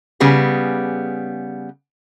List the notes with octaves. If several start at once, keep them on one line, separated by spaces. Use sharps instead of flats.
C#3 G3 B3 G#4